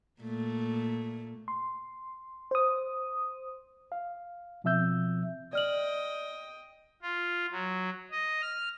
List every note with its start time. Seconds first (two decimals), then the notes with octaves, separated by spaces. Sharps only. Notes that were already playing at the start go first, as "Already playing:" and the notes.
0.21 A#2 A3
1.48 C6
2.51 C5 D#6
3.92 F5
4.64 B2 F3 C4 E5 E6 G6
5.53 D5 D#5 G5 F6 F#7
7.02 F4
7.52 F#3
8.11 D#5
8.41 F6